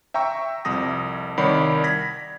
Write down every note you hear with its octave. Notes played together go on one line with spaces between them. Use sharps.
E5 G5 A#5 C#6 E6
C2 F2 D#6 A#6
C2 D#3 C#5 D5 B5 C7
G#6 A#6 B6